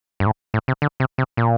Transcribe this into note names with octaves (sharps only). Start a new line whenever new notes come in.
G2
A2
A2
C3
D3
C3
C3
A#2